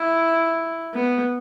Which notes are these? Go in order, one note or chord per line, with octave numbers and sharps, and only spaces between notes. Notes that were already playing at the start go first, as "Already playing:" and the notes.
Already playing: E4
B3